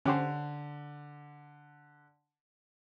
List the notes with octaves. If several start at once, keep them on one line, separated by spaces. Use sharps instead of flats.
D3 C#4 G4 C5